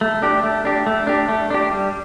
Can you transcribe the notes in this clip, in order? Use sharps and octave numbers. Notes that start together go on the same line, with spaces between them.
A3
D4 G4
A3
D4 G4
A3
D4 G4
A3
D4 G4
G3